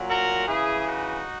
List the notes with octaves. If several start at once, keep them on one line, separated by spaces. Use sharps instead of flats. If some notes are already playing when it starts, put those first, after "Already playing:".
Already playing: A#2 F#3
F#4 A#4
C#3 E3 E4 G#4
D#4 F#4